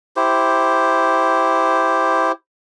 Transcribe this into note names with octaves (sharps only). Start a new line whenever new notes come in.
E4 G4 C5